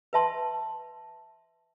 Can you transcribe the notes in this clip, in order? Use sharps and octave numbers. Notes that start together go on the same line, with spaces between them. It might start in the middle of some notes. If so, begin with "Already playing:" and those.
B4 E5 A5 C6